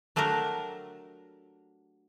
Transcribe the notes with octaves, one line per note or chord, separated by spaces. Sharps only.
F#3 A3 D4 G4 A#4